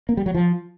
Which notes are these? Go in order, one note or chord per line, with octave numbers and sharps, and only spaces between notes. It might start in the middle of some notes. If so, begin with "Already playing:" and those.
A#3
G3
F#3
F3